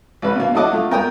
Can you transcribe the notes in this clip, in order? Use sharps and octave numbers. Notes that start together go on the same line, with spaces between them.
G#1 C3 B4
B2 A#3
F#3 E4 F#4 A4 D#5 D6
A3 F4
B3 A#4 G5 D#6